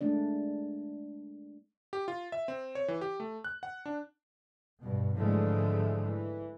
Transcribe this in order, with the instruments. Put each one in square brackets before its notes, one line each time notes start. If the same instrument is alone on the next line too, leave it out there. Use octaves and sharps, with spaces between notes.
[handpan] G#3 A3 D4 D5
[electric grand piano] G4
F4
E5
C4
C#5
E3
G4
A3
F#6
F#5
D4
[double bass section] G2 B2
G#2 D3 E3 F3 G#3 A3
E3